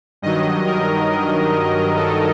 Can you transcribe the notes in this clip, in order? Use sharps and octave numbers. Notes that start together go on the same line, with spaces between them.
G2 D#3 F#3 D#5
A#4
A4